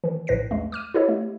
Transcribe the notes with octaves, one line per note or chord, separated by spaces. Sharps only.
D#3 E3
A#1 A2 B4 A#6 C7
E2 G#3 A3
D6 F6 D#7
E4 G4 A4 C#5 D#5
A3